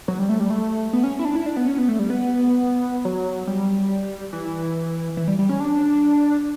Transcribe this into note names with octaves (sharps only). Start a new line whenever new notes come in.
F#3
G3
A3
G3
A3
B3
C#4
E4
D4
E4
D4
B3
C#4
B3
A3
G3
B3
F#3
G3
E3
E3
G3
G3
C#4
D4